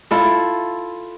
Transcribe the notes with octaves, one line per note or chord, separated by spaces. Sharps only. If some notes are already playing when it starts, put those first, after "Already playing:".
E4 F4 A4